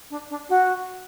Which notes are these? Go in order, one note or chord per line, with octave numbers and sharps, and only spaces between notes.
D4
D4
F#4